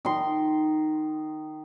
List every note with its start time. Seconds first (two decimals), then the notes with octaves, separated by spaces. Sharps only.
0.05 D#3 C6